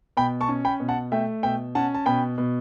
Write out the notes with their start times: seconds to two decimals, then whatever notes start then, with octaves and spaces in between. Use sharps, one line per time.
0.17 B2 G5 B5
0.41 A5 C#6
0.48 C#4
0.65 G5 B5
0.80 B2
0.89 F#5 A5
1.12 A3 E5 G5
1.43 B2 E5 G5
1.75 C#4 F#5 A5
1.94 A5
2.06 B2 G5 B5
2.38 B2